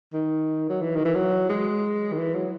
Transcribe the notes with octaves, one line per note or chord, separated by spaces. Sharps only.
D#3
F#3
E3
D#3
E3
F#3
G#3
D#3
E3
F#3